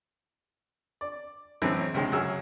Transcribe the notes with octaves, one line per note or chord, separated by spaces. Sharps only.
D5
F#2 A2 E3 G#3 C4
C#2 G2 C3 G#3 G5
C#2 F#2 F#4 G#4 E6 F6